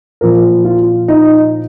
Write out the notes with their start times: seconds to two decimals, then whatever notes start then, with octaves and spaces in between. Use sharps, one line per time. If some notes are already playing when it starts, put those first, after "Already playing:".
0.21 A#2 F3 A#4
0.65 F4
1.08 D#4